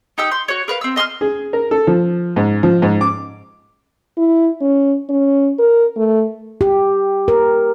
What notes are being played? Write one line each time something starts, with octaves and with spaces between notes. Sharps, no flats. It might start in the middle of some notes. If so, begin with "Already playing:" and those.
D#4 G4 G5 E6
C6 G6
F#4 C#5
A#4 B4 F5
C4 E6
D#5 C6 E6 F6
G#4
A#4
A4
F3
G#2
F3
G#2
D6
E4
C#4
C#4
A#4
A3
G4
A#4